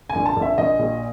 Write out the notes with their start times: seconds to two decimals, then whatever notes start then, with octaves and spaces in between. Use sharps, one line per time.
0.10 G#5
0.15 A#1
0.26 A5
0.36 A#1
0.42 E5
0.58 A#1 D#5
0.79 A#2